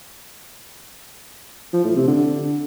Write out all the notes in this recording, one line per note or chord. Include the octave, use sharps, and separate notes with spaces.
F3
A2
C3
D3